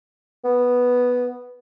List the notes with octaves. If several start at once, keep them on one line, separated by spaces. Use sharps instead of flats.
B3